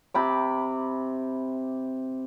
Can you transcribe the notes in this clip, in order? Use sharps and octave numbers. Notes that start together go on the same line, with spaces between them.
C3 B5 D6